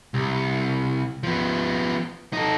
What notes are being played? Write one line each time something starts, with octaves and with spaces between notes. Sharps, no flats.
C2
F3 B3
D#4 A4